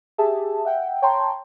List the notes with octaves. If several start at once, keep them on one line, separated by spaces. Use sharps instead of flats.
G4 G#4 E5 A5
E5 F#5 G5
C#5 G5 A5 A#5 C6